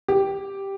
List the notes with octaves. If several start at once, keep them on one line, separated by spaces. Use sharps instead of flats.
G4